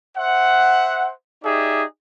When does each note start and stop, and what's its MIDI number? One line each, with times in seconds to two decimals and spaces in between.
0.17 1.11 72
0.17 1.11 76
0.17 1.11 78
1.44 1.83 63
1.44 1.83 67
1.44 1.83 68
1.44 1.83 74
1.44 1.83 76